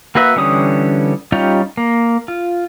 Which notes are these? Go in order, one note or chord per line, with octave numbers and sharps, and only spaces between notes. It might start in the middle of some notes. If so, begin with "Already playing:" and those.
A#3 F#4 B4 E5
D3 E3 G3 C#4 D#6
G3 C#4 D#4 F4 G4
A#3
F4